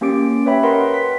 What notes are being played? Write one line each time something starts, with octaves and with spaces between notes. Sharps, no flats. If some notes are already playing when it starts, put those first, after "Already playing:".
A#3 C#4 G4 D6 D7
B4 C#5 E5 G5 B5
A#4 B4 D#5 F#5 C6
B6